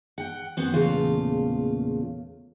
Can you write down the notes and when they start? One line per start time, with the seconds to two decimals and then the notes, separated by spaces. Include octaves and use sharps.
0.18 F#5 G5
0.57 F#2 E3 B3 C4 F#5
0.73 E2 A#2 C#3 A3 F4